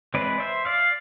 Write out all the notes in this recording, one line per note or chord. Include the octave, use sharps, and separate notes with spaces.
E3 G#3 C4 B4 D5
C5 E5
D5 F5